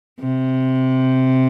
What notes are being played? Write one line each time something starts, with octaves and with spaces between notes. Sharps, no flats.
C3